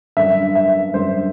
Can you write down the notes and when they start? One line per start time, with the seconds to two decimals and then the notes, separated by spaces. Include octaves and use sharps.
0.17 F#2 D3 G3 E5
0.55 E5
0.94 F#2 D3 G3 C5